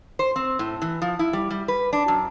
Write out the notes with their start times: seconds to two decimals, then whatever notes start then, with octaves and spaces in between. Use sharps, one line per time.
0.19 C5
0.36 C4
0.59 A2
0.82 E3
1.02 F3
1.19 E4
1.33 G3
1.50 G3
1.68 B4
1.93 D4
2.08 F#2